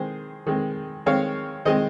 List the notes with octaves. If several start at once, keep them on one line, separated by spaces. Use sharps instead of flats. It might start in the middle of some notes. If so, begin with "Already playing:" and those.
Already playing: D#3 G#3 C4 G#4 C5
D#3 G#3 C4
D#3 G#3 C4 C#5 F5
D#3 G#3 C4 C5 D#5